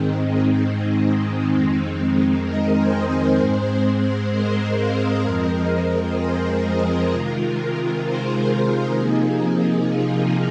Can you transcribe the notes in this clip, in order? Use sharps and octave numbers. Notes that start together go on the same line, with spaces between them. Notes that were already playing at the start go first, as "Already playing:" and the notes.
Already playing: G#2 D#3 G#3 C4 D#4
D#4
F2 D#3 G#3 C4
A#4 D#5
G#4 C5
G#4 C5
G#2 G#3 C4
A#4 D#5
C5 F5
F2 F3 G#3 C4 A#4 D#5
G#4 C5
C3 D#3 G#3 F4 A#4
G#4 C5
F4 A#4
C3 F3 A#3 D#4 G#4
F4